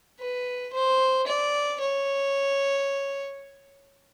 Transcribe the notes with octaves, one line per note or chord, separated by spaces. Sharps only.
B4
C5
D5
C#5